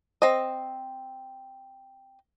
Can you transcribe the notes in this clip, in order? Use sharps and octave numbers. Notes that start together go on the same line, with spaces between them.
C4 D#5